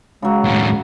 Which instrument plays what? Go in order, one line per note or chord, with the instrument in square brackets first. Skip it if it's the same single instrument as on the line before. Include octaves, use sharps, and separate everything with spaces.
[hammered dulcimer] C#3 F#3 [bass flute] G#3
[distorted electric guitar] D#2 A2